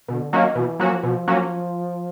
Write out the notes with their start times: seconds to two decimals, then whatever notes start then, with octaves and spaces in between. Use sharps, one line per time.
0.08 B2 D3
0.32 D#3 F#3 A#3 C#4 F#4
0.55 B2 E3
0.80 F3 F#3 A#3 C#4 F#4
1.03 B2 F3
1.28 F#3 A#3 C#4 F#4